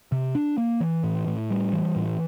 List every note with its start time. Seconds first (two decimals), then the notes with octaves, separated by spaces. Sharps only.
0.12 C3
0.35 D4
0.58 A#3
0.80 E3
1.04 A2
1.27 A2
1.50 G3
1.73 E3
1.96 A2